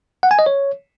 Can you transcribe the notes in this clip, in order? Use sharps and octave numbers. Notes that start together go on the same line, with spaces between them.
F#5
G#5
D#5
C#5